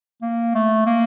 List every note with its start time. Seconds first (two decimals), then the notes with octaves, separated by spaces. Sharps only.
0.22 A#3
0.55 A3
0.86 A#3